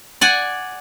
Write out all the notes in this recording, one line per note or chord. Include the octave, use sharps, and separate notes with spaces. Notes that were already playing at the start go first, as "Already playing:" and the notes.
D5 F#5 G#5